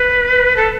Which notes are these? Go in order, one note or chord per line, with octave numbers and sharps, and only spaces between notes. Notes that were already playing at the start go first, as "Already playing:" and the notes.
Already playing: B4
A4